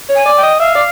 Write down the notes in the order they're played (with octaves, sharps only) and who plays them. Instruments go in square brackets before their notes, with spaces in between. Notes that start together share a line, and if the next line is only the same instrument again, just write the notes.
[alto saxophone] C#5
[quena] G#5
[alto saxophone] D5
[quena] G5
[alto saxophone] D#5
[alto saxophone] E5 [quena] F5
[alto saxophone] D5